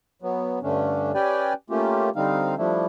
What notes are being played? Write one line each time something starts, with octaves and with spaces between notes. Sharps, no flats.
F#3 B3
G2 D3 A3 C#4 D4
C#4 G4 B4 D5 G5 G#5
A3 A#3 C#4 F4 G4
D3 G3 C4 D#4 F5
F3 G3 A3 D4 E4